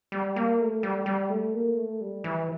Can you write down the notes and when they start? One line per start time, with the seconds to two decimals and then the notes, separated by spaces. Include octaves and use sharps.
0.12 G3
0.36 A#3
0.60 A3
0.83 G3
1.06 G3
1.30 A3
1.54 A#3
1.77 A3
2.01 G3
2.24 E3